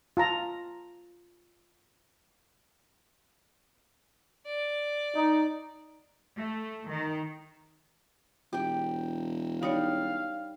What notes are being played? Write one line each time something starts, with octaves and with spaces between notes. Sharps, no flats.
F4 A5 A#5
D5
D#4
A3
D#3
E1 G4 G5
G3 D#4 C#5 D#5 F5